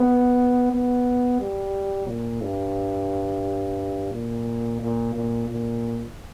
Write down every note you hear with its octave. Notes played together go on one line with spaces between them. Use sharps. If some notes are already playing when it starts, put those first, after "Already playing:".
Already playing: B3
B3
G3
A#2
G2
A#2
A#2
A#2
A#2